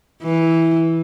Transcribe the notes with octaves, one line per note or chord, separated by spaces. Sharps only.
E3